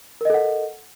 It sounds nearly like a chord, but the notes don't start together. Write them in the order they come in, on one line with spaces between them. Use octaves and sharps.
A#4 D#5 A4 F#5